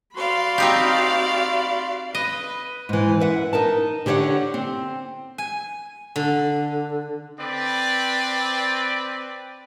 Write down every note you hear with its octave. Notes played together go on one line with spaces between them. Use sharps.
F#4 D5 F5 B5 C6
C4 D#4 G4
B4 D#5
G#2 E3
B4 E5 F#5
D#4 A#4 A5
D3 G4 C#5 F5 F#5
C4
G#5
D3
C4 B4 D5